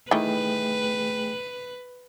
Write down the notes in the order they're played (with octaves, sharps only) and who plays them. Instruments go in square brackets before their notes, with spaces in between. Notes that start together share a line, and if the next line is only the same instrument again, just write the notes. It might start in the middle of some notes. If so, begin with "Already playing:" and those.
[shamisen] D#3 E3 [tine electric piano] A3 G#4 G5 [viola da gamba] B4